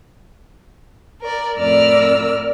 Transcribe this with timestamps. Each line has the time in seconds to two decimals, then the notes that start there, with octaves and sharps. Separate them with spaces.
1.20 A#4 D5
1.57 F2 A2 A#4 D5 E6 F6